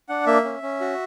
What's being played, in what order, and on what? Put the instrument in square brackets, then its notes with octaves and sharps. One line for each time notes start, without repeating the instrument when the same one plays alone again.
[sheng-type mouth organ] D4 F#5
A#3 E5
C#4
C#4
F#4